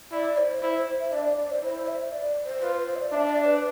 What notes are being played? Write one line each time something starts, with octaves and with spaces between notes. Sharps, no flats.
E4 D5
C5
E4 C5
C5
E5
D4 D5
D5
D5
C5
E4 C5
E5
D5
C5
F4 B4
C5
C5
E5
D5
D4 E5
D5
B4